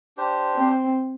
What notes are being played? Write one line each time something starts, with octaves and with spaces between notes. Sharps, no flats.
D4 G4 C5
C4